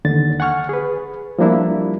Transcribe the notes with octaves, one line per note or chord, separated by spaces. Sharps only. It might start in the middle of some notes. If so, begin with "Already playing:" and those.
D#2 D3 A6
F#5 G#5 C#6 F6
G#4 B4
F3 G3 A#3 D4 E4